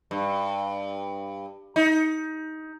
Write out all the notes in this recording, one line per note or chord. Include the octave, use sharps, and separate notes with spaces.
G2
D#4